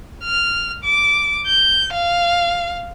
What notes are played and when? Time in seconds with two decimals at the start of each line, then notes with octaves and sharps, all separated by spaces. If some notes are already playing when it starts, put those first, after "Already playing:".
0.24 F6
0.84 D6
1.47 G6
1.94 F5